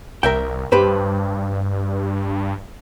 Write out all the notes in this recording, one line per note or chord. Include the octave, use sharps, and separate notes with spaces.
C2 A#4 E5 G5
G2 G4 B4 C5